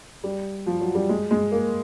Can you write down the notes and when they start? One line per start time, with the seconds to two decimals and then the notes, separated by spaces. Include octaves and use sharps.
0.24 G3
0.66 F3
0.81 F#3
0.95 G3
1.09 G#3
1.31 G#3
1.52 A#3